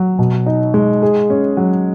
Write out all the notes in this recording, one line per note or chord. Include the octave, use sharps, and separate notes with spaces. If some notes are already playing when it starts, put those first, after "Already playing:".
Already playing: F#3
B2
D#4
G#3
G#4
C#4
F#3